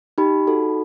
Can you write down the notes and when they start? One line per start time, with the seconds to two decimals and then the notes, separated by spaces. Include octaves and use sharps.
0.18 D#4 G4 B5
0.47 D#4 F#4 A4